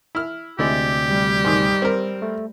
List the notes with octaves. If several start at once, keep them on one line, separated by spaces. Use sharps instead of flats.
E4 F6
D2 C3 G#3 E4 G4 D5
G3
G#2 D#3
C4 A#4
A3